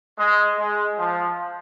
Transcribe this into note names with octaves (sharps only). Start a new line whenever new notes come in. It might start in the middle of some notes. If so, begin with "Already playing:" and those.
G#3
G#3
F3